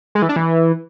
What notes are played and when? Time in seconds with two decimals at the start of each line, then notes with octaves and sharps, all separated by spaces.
0.15 G#3
0.22 E3
0.29 D4
0.36 E3